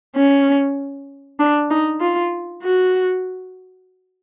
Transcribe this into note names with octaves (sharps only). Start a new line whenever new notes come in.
C#4
D4
D#4
F4
F#4